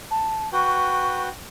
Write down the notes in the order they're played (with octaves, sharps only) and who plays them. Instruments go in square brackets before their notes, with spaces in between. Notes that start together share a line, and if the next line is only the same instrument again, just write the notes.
[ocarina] A5
[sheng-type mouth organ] F#4 B4 G5 [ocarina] C#6